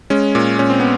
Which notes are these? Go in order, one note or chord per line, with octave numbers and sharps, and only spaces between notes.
G#3 C#4
A#2
A#2 C#4
C4
B3